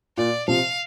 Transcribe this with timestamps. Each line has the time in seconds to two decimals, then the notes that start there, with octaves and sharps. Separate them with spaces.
0.18 A#2 D5
0.48 C3 F3 F5